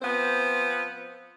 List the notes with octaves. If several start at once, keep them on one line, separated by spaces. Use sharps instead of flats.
F3 B3 C4 C5